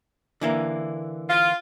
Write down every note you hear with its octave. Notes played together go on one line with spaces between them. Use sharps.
D3 E3 A#3
F4